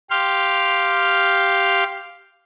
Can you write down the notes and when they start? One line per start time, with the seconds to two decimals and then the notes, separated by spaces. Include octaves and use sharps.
0.10 G4 F5 C6 F6